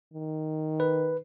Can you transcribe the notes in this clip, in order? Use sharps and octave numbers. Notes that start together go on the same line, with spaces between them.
D#3
B4